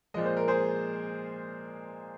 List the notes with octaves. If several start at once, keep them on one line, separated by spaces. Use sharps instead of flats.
A#2 F3 G#3 D#5
C5
A#4
G#4 C5